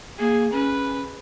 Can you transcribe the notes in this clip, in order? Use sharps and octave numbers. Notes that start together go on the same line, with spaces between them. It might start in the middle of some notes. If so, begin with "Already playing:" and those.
A#3 G#4
C#4 B4